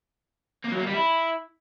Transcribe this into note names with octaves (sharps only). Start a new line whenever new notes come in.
A#3
F#3
A#3
G3
E4